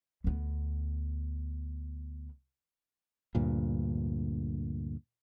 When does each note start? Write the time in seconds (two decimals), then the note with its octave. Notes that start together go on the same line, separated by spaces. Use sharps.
0.24 D2 B3
3.35 D2 G2 A#2